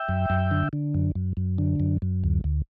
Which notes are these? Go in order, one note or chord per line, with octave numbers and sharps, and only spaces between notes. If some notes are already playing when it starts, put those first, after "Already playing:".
Already playing: E5 G5
F#2
F#2
D3
D3
F#2
F#2
F#2
D3
F#2
F#2
D2
D2